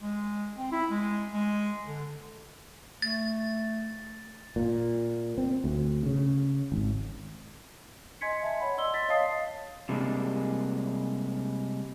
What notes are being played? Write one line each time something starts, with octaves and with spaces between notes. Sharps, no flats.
G#3
C4
E4
G#3
G#3
D3
A3 A6
A#2
C4
D2
C#3
G#1
D#5 G#5 C6 G#6 B6 C#7
E5 A5
C#5 F#5 B5
D5 D#5 C6 E6 G7
C6 A6 B6
C#5 D#5 F5 A5 D#6 C7
C3 G3 G#3 A#3 D4